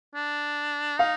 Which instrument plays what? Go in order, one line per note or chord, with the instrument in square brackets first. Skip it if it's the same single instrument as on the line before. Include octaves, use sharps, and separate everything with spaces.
[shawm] D4
[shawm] D#4 [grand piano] F5